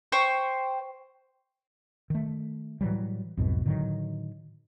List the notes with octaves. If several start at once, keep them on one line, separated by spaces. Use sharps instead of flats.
C5 G5 C#6
D#3 A3
A2 E3 F#3 G3
B1 F2 G#2 B2
A2 D3 D#3 F#3